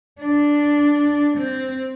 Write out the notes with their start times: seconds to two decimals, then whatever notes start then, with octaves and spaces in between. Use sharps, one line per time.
0.20 D4
1.38 C4